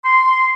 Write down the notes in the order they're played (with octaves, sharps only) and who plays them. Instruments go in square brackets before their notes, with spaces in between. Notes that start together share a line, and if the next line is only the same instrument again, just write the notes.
[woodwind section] C6